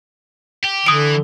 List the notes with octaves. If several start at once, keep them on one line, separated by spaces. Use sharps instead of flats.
G4
D3 E3 D#6 D7